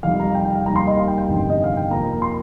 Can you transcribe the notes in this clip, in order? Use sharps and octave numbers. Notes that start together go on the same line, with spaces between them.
F2 C3 D#3 G3 F5
A#5
G5
G5
F5
D#2 D#3 G3 A#3 A#5
C6
D#5
F5
G5
G5
G1 F2 C3 D#3
D#5
F5
G5
F2 F3 A#3 A#5
C6